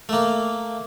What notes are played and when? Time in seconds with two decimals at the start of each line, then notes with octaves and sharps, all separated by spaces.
0.09 A3 A#3